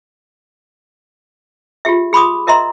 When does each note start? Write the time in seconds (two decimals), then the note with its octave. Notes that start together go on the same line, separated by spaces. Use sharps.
1.85 F4 G4 G#4 E5
2.13 G#4 B5 C6 D6 D#6
2.47 A#4 D#5 E5 A#5 C6